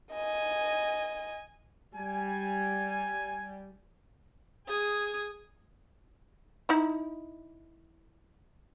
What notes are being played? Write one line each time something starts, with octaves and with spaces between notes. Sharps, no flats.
D#5 G#5
G3 G#5
G#4 D#6 G#6
D#4 E4